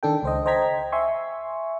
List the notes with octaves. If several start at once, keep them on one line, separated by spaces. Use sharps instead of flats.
D#3 D4 A4 G5
C#2 C5 D#5
C5 D#5 G5 A#5 G#6 B6
E5 G#5 C6 C#6